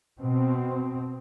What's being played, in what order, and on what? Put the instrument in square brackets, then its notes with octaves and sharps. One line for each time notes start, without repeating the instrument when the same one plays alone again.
[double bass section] B2 C4